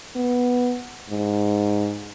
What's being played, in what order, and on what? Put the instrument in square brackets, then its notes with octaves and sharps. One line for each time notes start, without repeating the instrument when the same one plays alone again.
[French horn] B3
G#2